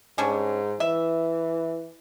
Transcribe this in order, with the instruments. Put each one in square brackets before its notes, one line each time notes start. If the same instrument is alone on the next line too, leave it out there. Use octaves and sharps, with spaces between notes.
[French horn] G#2 [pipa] G3 C#4 D4
[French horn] E3 [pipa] E5